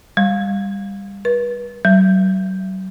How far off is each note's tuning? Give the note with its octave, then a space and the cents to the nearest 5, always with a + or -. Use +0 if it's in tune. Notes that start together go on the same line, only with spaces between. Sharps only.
G3 +20
B4 -35
F#3 +35